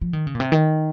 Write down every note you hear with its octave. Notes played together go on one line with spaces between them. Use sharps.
F3
D#3
C#3
A#2
C3
D#3